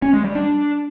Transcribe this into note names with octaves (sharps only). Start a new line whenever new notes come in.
C#4
G#3
G3
D4